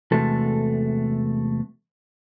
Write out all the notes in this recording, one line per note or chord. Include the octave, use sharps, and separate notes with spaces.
E2 C3 G#3 A3 F#4 A4